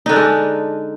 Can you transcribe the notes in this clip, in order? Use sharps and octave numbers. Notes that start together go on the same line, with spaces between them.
D3 G#3 D4 D#4